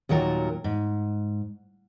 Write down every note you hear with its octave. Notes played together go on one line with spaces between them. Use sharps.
D#2 A#2 F#3 A#4
G#2